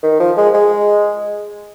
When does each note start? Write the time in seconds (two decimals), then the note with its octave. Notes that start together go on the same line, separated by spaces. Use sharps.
0.03 D#3
0.20 F3
0.37 G#3
0.54 G#3